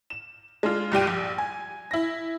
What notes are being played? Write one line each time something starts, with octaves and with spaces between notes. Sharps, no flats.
E7
G#3 D4 F4
C2 G2 G4 D#7
A#1
G#5
E4 A#6